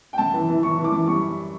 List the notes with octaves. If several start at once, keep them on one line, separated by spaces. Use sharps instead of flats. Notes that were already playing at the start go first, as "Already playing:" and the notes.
G5
F#2 A5
E3
E3
E3 C#6
E3
D6
F#2
G3 C#6